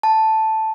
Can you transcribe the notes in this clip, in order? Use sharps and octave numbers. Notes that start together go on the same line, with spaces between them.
A5